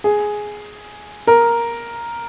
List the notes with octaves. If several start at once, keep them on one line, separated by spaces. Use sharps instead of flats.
G#4
A#4